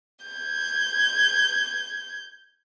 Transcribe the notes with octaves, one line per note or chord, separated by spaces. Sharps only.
G6 G#6